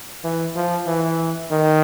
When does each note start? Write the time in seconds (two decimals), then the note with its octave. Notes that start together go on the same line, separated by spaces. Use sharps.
0.24 E3
0.55 F3
0.87 E3
1.51 D#3